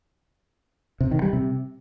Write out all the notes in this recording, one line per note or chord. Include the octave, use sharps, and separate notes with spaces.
C3
D#3
G3
C3